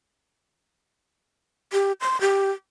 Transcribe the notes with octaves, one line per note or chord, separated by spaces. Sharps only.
G4
C6
G4